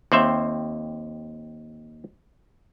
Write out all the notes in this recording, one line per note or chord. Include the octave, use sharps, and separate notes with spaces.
D#2 C4 C5 E5